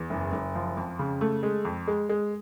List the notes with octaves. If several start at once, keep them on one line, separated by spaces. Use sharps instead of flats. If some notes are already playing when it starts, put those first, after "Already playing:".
Already playing: E2
F#1
F#1
F3
F2
C#3
A3
G#3
F2
G#3
G#3